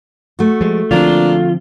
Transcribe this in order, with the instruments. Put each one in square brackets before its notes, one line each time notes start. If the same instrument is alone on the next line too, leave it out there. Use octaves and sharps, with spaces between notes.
[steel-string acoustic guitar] A3 F#4
[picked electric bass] F3 G#3
[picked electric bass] D3 F3 C4 [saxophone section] A#3 D4 [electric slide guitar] F4